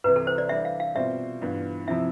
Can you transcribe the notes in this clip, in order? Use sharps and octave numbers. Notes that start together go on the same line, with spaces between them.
C2 C3 E3 B4
A4
C5
D5
E3 G3 D4 E5
F5
F5
B2 G3 C4 F4 C5 E5
G2 E3 B3 F4
C3 F3 C4 E4 E5